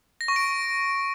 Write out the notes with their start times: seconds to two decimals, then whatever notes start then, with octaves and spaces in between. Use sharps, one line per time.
0.21 A#6
0.28 C#6
0.36 D7